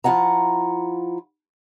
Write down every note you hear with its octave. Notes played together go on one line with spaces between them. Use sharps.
F3 E4 F4 F#5 A#5